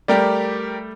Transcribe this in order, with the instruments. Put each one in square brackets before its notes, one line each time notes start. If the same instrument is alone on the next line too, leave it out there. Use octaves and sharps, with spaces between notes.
[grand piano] G3 A3 [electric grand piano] G4 A#4 D5